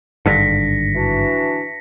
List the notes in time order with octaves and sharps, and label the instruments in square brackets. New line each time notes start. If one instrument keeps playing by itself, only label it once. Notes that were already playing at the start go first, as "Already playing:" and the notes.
[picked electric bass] G#1 G2 D3 [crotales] A#6 B6 C#7
[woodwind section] E3 D4 F#4